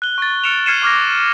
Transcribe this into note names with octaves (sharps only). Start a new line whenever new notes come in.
F#6 G7
C#6 A6
F6 C#7 D7 E7 F7
F6 G#6 C7 C#7 D#7 E7
C#6 D6 F6 G#6 A#6